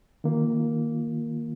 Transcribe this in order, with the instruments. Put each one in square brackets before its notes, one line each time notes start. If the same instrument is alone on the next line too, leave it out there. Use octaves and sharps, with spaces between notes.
[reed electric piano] D#3 A#3 F4